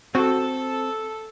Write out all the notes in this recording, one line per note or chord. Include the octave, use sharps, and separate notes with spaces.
C4 F#4 A4